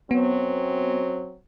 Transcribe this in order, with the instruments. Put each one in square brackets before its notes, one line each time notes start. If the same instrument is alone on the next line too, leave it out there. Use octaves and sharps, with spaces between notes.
[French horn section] F#2 F#3 C4 [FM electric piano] B3